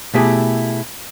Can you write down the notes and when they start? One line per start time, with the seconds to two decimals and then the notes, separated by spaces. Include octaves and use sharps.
0.14 B2 A3 E4 G4 G#4